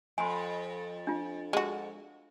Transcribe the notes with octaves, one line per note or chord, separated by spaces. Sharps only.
F2 G#5 C6
D4 F4
G#3 F#4